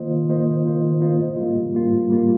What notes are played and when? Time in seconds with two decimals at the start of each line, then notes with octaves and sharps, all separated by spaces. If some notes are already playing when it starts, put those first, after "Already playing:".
Already playing: D#3 A#3 F4 C5 D#5
0.10 D#3
0.29 A#3 F4 C5 D#5
0.47 D#3
0.65 A#3 F4 C5 D#5
0.82 D#3
1.01 A#3 F4 C5 D#5
1.19 G#2
1.37 G3 A#3 F4
1.55 G#2
1.73 G3 A#3 F4
1.92 G#2
2.10 G3 A#3 F4